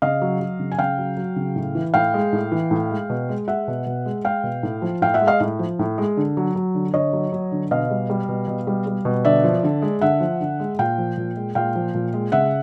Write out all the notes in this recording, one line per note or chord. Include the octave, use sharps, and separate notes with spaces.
C#3 D#5 F5
F#3
F#3
C#3
G#5
C#3 F5 G5
F#3
F#3
C#3
A2
E3
A2 F5 G5
G#3
A2
E3
A2
G#3
B2
G#3
G#3 E5 F#5
B2
B2
G#3
G#3 F5 G5
B2
A2
F3
A2 F5 G5
E5 F#5
G#3
D#5 F5
A2
F3
A2
G#3
D3
F#3
F#3
D3
D3 C#5 D#5
F#3
F#3
D3
B2 D#5 F5
G3
G3
B2
B2
G3
G3
B2
D3 D5 E5
F3
D3
G#3
D3 E5 F#5
F3
D3
G#3
A#2 F5 G5
F3
A#2
G#3
A#2 F5 G5
F3
A#2
G#3
C#3 E5 F#5